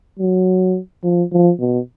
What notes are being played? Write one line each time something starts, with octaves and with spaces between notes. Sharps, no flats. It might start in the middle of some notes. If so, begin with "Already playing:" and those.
F#3
F3
F3
B2